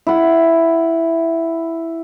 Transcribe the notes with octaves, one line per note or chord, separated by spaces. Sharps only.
E4 F#5